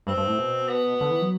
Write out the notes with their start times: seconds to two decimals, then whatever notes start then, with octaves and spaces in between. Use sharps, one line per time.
0.07 G2 C4
0.17 G2
0.28 A2
0.38 B2
0.69 B3
1.01 D3
1.11 E3
1.21 F#3